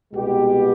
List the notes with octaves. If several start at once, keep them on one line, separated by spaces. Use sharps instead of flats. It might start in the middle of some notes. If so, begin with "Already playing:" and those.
C2 B2 G#3 B3 G4